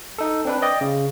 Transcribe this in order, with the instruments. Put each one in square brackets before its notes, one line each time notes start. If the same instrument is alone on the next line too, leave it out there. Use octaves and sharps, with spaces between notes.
[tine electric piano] D#4 A4
C4 D4 B4
D5 D#5 G5
C#3